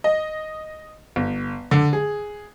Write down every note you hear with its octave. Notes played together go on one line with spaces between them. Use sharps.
D#5
G1
D3
G#4